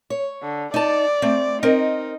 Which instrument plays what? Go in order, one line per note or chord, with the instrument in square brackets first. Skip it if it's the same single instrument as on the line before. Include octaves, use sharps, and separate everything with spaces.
[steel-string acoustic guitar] C#5
[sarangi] D3
[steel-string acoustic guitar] D#4 A5 [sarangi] D5
[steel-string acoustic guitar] A3 C4
[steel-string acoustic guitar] C4 A#4 D#5 [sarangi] D#4